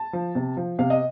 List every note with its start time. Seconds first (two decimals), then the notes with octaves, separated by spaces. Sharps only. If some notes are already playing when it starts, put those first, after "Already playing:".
Already playing: A5
0.13 F3
0.35 C3
0.57 F3
0.79 C3 F5
0.90 D#5